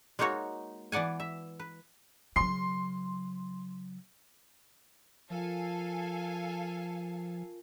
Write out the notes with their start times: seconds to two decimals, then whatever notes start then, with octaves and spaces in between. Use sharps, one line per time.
0.19 G#3 A#3 D#4 F#4 C#5
0.92 E3 B3 D5 F#5 G#5
1.20 E5
1.59 B4
2.36 C#3 F#3 C6 C7
5.30 F3 F4 A4 A#4 F5 G#5